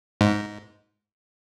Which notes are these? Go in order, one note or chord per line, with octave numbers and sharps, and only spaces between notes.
G#2